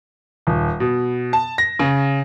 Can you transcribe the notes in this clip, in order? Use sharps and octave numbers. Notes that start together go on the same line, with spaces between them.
D#1
B2
A5
A#6
C#3